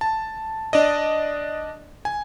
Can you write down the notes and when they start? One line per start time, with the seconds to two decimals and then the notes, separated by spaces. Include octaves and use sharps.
0.01 A5
0.73 D4 D5 D#5
2.05 G#5